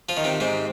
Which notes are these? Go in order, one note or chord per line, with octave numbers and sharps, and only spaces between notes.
F3 F4
D#3
C3 C4
G#2 C3 C4